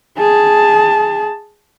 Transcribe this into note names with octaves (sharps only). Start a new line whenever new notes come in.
G#4 A5